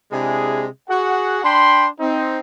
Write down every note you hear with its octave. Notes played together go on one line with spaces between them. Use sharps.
C3 G#3 D4 E4 G#4
F#4 G#4 F#5
D4 G5 B5 C6
C4 D#4